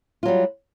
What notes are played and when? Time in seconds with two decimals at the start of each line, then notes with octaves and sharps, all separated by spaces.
0.23 F4
0.25 F#3
0.28 G3